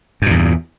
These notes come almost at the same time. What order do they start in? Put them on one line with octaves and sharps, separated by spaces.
G2 A#2 E2